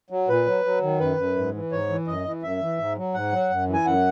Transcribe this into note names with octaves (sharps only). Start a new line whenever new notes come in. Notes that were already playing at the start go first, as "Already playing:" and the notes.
F#3
A#2 B4
F#3
F#3
D#3
F#2 B4
F#2
G#2
E3
G#2 C#5
E3
F#2 D#5
E3
F#2 E5
E3
G#2
F#3
G#2 F#5
F#3
F#2
E3
G#5
F#2 F#5